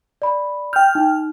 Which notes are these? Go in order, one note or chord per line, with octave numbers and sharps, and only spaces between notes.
D5 B5
G5 F6 G6
D#4